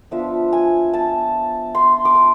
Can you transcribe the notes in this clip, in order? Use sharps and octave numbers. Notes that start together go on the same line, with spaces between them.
F3 B3 D4 F4 E5
G#5
A5
C6
D6
C6